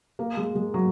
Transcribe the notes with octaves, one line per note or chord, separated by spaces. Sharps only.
A#3
G#3
G#3
F#3